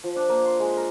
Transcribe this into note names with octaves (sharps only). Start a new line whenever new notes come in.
F3
D4
A#3
C6
G#3
A#4